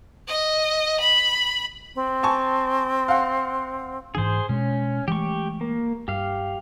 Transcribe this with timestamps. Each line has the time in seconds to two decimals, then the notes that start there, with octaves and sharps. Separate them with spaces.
0.27 D#5
0.99 B5
1.95 C4
2.23 G#5 A5 C#6
3.08 F5 F#5
4.15 G#2 E3 D4 G#4 C5
4.49 B2 G#3 C#4
5.08 E3 G#3 A3 G4 C#6
5.61 A#3
6.08 G2 G4 F5